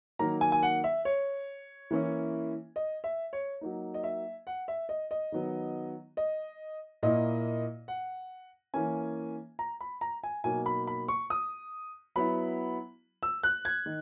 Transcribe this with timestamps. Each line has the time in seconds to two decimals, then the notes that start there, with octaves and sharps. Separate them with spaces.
0.19 D#3 F#3 A#3 A#5
0.41 G#5
0.52 G#5
0.63 F#5
0.84 E5
1.05 C#5
1.91 E3 A#3 C#4 E4
2.76 D#5
3.04 E5
3.33 C#5
3.61 F#3 A#3 D#4
3.94 D#5
4.04 E5
4.47 F#5
4.68 E5
4.89 D#5
5.11 D#5
5.32 D#3 F#3 B3
6.17 D#5
7.03 A#2 A#3 E4 D#5
7.88 F#5
8.74 E3 A#3 C#4 G#5
9.59 A#5
9.81 B5
10.01 A#5
10.24 G#5
10.44 B2 F#3 A#3 D#4 G#5
10.66 B5
10.87 B5
11.08 C#6
11.30 D#6
12.16 F#3 B3 E4 B5
13.23 E6
13.43 F#6
13.65 G#6
13.86 D#3 D#4